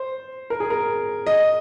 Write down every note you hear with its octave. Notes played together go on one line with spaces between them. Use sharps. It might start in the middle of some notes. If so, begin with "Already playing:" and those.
Already playing: C5
A#4
G#4
A#4
D#5